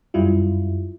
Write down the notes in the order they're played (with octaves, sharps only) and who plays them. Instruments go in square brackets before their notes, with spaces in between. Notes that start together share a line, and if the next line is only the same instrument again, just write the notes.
[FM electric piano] F#2 F#3 G3 E4 F4